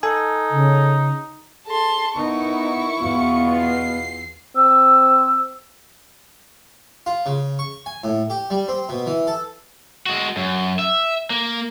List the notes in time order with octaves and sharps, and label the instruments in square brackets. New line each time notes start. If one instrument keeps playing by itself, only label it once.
[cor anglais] D#4 [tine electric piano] A4 G#5
[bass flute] C#3
[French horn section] G#4 A4 [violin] A5 C6
[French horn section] B3 A#4 [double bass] D#4 [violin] E4 C#6
[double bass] E2 [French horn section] B2 F4 [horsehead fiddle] B3
[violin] C7
[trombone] C4 [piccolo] E6
[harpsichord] F4
C#3
C#6
G#5
A2
G4
G3
C4
B2
E3
A4
[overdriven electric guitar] G#3 F#4
F#2
E5
A#3